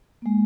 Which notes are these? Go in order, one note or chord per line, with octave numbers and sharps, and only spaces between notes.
A#3
G#3